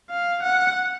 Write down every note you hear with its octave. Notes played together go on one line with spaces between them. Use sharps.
F5
F#5